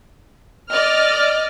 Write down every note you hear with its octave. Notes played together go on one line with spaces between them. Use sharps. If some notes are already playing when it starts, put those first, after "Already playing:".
D5 D#5 F6